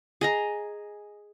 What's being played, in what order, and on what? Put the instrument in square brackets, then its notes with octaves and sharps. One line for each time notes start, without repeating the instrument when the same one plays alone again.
[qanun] G#4 D#5 A#5